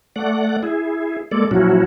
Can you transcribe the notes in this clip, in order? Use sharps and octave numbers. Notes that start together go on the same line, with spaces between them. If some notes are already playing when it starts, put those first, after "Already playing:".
A3 D5 F#5
E4 G#4
G#3 A#3 A4 D5
A#2 F3 F#3 C#4 E4 F#4